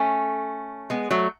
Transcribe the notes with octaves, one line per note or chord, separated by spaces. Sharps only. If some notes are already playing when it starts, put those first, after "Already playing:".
Already playing: A3 C#4
G#3 B3
F#3 A3